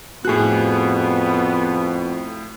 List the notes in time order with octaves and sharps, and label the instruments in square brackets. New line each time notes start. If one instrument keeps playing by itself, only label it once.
[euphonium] F2 [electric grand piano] A2 F#6 [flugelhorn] B3 [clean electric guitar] F#4 G#4